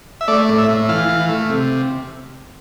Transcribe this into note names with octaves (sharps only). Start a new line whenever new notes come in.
E5
A3 D5
A2
E5
A2
E3 F5
E3
A3
C3